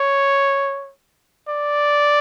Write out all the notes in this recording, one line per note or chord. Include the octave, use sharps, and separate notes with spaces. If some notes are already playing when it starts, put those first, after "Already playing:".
Already playing: C#5
D5